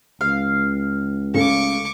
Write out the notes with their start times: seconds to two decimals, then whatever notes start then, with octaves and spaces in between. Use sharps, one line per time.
0.21 C#2 F5
1.34 C#3 A3 C#6 D6